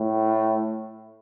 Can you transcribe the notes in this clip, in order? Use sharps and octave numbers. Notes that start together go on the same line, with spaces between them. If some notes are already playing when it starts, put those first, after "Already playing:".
Already playing: A2